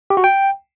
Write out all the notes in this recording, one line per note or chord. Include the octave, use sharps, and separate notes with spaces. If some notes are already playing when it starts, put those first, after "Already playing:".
G4
F#4
G5